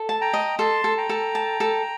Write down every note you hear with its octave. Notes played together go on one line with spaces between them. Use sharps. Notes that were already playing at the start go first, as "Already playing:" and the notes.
Already playing: A4
A5
G5 A#5
D#5
A4 A5 C6
A4
G5 A#5
A4
A5
A4